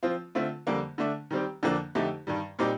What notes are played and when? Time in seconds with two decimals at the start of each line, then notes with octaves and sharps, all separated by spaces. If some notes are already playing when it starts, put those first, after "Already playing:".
0.03 F3 C4 F4
0.35 D3 A3 C4 F4
0.67 F2 D3 G3 A#3
0.98 D3 A3 D4
1.31 D#3 G3 C4 G4
1.63 F2 D3 F3 A#3 D4
1.95 F2 D3 A3 D#4 G4
2.27 G2 D#3 G3
2.59 A#2 G3 C4 D#4 G4